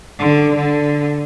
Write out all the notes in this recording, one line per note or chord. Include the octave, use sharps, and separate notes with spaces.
D3
D3